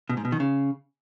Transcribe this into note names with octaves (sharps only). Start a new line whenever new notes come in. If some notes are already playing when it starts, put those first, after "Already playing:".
B2
G#2
B2
D#3
C#3